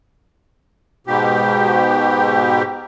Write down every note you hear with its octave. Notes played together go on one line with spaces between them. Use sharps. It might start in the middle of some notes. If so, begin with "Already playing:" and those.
G#2 B2 G4